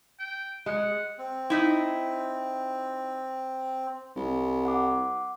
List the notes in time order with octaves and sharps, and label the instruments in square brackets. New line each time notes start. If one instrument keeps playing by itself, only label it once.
[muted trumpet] G5
[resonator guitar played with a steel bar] G#3 [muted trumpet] F#5
[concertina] C4
[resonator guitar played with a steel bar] D#4 E4
[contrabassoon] C2
[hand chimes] F#5 D6